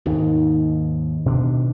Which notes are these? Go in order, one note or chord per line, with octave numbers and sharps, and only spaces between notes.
D#2 G#2 D#3
B2 C#4 D4